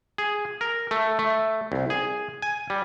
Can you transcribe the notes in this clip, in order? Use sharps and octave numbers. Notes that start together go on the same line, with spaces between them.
G#4
A#4
A3
A3
C2
G#4
G#5
G3